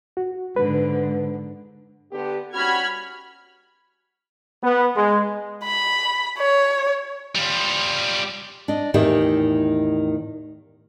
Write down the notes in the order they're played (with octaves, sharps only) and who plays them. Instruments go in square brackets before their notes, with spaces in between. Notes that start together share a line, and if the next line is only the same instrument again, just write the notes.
[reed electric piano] F#4
[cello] G#2 D3 [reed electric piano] B4
[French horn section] D3 B3 G4
[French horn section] G3 C#4 F#4 [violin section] B5 F6 G#6
[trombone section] B3
G#3
[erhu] B5
C#5
[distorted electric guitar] G3 F4
[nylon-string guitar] D4 D#5
E2 A2 D#3 G4 E5